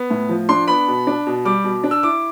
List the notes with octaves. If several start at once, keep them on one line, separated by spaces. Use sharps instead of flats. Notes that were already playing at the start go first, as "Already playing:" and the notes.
Already playing: B3
A2
F3
D4 C6
B3 B5
B2
D4
B2
G3 D6
B2
D4
E6
E4 D6